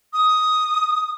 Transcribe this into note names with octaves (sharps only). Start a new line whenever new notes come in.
D#6